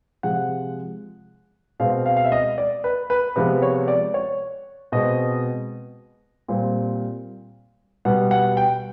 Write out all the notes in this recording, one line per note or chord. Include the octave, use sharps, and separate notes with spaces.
C3 F3 G#3 F#5
B2 G#3 C4 F5
F5
F5
E5
D#5
D5
B4
B4
C3 F3 G#3 B3 B4
C#5
D5
C#5
B2 G#3 C4 D#5
A#2 G3 C4
B2 G3 B3 F#5
F#5
G5